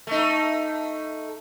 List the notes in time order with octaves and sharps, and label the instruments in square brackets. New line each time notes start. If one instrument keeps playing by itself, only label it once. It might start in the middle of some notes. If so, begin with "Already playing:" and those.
[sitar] A3 D#4